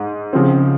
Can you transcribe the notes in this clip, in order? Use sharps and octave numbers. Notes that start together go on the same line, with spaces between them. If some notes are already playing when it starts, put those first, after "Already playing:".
Already playing: G#2
C#3 F3 C4